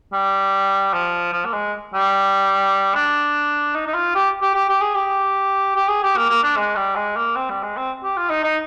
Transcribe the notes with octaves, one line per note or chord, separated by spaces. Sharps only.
G3
F3
F3
A#3
G#3
G3
D4
D#4
D#4
F4
G4
G4
G4
G4
G#4
G4
G4
G#4
G4
A#3
A#3
D4
G#3
G3
G#3
A#3
C4
G3
G#3
C4
G4
F4
D#4
D#4